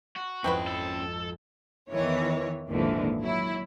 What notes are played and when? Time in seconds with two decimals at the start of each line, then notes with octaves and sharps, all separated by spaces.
0.16 F#4
0.44 G#1 F2 C4 C#4 E4 B4 D#5 G5
0.67 A4
1.92 E2 D#3 E3 C#5
2.69 G#1 D#2 A#2 D3 E3 F3
3.21 F#3 E4